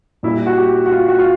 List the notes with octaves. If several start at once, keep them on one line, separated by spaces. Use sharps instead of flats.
A#2 G3 E4
F#4
G4
F#4
F4
F#4
F4